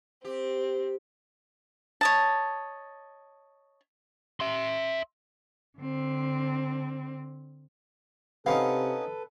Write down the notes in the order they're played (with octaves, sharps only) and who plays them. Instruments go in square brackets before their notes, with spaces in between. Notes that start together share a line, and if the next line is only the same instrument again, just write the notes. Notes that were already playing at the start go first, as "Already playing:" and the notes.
[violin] C4 [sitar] G4
[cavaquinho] C#5 D#5 A5
[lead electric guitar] E5 C6
[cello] D3 C4
[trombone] C3 [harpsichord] B3 C#4 D#4 [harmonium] A4 B4 [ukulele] F5